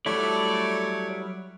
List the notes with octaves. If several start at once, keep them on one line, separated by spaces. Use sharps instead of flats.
F#3 G3 A3 E4 C#5 D5